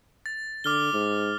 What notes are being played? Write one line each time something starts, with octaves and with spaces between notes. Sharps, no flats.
A6
D3 D6 F6 G7
G#2